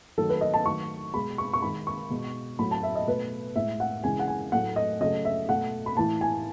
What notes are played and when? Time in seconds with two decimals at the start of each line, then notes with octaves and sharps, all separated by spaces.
0.18 D#3 F#3 A3 A4
0.29 B4
0.41 D#5
0.54 A5
0.66 D#3 F#3 A3 C#6
1.14 B2 G#3 B5
1.38 C#6
1.53 C#6
1.62 D#3 G#3 B5
1.87 C#6
2.10 B2 G#3
2.59 A2 F#3 A3 B5
2.71 A5
2.83 E5
2.95 D#5
3.07 B2 A3 B4
3.56 A2 G#3 E5
3.80 F#5
4.04 C#3 E3 G#3 G#5
4.19 F#5
4.28 G#5
4.52 A2 F#3 A3 F#5
4.76 D#5
5.01 C#3 F#3 A3 D#5
5.25 E5
5.49 B2 A3 F#5
5.86 B5
5.97 A2 E3 A3 A5
6.21 G#5